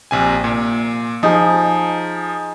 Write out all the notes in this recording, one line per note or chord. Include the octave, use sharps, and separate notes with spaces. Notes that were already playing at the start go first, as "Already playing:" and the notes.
A#1 C3 G#5
A#2
F3 D#4 G#4